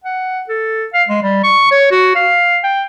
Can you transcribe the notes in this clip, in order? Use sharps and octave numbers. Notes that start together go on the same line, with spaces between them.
F#5
A4
F5
G#3
G3
C#6
C#5
F#4
F5
G5